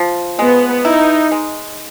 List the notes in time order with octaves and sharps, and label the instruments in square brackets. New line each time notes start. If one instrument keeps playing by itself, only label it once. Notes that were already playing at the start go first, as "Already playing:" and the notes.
Already playing: [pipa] F3
[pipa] G#3 [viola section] B3
[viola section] D#4 [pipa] E4
[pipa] G#3